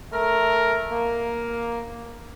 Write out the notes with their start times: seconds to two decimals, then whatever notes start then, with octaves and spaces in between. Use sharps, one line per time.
0.12 A3 A#4
0.91 A#3